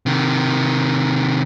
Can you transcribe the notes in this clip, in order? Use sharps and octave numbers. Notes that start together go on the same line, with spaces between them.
C3 D#3